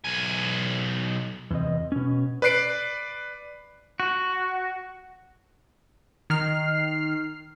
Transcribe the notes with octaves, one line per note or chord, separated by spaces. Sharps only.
B1 G#5
E2 C3 D#5
B2 C#4
B4 D5 F#6 C7 D7
F#4
D#3 F6 C7